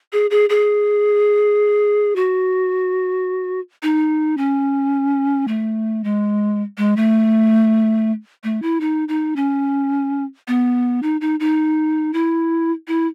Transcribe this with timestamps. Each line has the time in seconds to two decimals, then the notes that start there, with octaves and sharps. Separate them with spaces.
0.12 G#4
0.30 G#4
0.49 G#4
2.16 F#4
3.82 D#4
4.37 C#4
5.48 A3
6.04 G#3
6.77 G#3
6.96 A3
8.44 A3
8.62 E4
8.80 D#4
9.08 D#4
9.36 C#4
10.48 B3
11.02 D#4
11.21 D#4
11.40 D#4
12.13 E4
12.88 E4